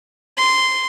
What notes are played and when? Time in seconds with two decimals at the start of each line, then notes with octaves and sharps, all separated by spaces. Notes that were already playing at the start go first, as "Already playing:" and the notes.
0.37 C6